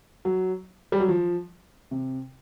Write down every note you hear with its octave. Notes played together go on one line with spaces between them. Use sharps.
F#3
G3
F#3
F3
C3